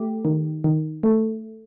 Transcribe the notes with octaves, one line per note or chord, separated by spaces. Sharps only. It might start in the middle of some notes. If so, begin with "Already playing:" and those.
Already playing: A3 G4
D#3
D#3
A3